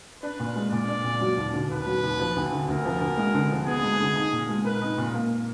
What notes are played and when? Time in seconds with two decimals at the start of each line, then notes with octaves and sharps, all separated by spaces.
0.23 D4 B4
0.40 A#2
0.56 G#3
0.72 A#2 D5
0.88 D4
1.04 A#2
1.21 F#3
1.37 D#2
1.53 D3
1.70 D#2 B4
1.87 F#3
2.03 D#2
2.20 F3
2.36 D2
2.52 D3
2.68 D2 A#4
2.85 F3
3.01 D2
3.17 G#3
3.34 D3
3.51 F3
3.67 B3 G#4
3.83 G#3
4.00 D3
4.16 D#4
4.33 A#2
4.49 G#3
4.65 A#4 B4
4.82 D#4
4.98 A#2
5.14 A#3